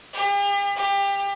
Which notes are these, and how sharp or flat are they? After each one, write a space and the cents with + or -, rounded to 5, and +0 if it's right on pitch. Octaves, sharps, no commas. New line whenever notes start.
G4 +45
G4 +25